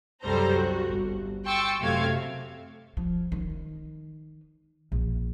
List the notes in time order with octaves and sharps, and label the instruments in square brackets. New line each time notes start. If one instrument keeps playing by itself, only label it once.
[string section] C2 F#2 G3 A4 C5 A#5
F#4
G1
G5 C6 C#6 E6 A6
F#2 C3 A3 F5 G#6
[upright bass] F3
D#3
A#1